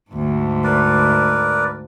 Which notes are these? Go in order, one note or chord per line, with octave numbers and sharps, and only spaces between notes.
D2 G#2
A#4 B4 D5